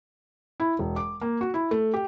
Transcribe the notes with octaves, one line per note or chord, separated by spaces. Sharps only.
E4
E1
D6
A#3
F#4
E4
A3
G4